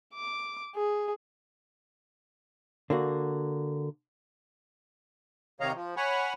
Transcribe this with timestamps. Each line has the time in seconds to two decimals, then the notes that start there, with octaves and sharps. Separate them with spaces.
0.14 D6
0.75 G#4
2.90 D3 A#3 F#4
5.60 C3 D#3 C#5 D#5 F5 A#5
5.75 F3
5.97 C#5 F#5 G#5 B5 C#6